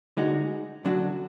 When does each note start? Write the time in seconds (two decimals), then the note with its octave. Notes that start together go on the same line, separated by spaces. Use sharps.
0.17 D3 G#3 D#4 F#4
0.85 D2 D3 F#3 D4 F#4